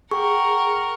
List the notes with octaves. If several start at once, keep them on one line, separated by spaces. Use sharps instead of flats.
G#4 A#4 F#5 G5 C#6